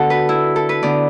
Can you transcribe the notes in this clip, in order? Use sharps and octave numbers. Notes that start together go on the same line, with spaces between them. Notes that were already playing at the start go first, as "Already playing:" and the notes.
Already playing: D3 B3 F#4 A4
B4
E4
A4
B4
D3 B3 D5